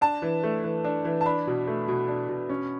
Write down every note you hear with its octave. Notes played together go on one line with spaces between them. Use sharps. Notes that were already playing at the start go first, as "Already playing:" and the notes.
D4 A5
E3
A3
E3
D4
E3
A5
D4 B5
B2
A3
B2
D4
B2
C#4